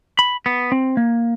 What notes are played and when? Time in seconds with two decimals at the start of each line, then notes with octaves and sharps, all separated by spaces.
0.19 B5
0.46 B3
0.72 C4
0.97 A#3